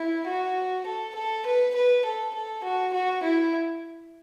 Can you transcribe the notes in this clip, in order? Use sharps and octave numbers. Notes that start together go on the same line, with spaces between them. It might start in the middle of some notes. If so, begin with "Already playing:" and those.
Already playing: E4
F#4
A4
A4
B4
B4
A4
A4
F#4
F#4
E4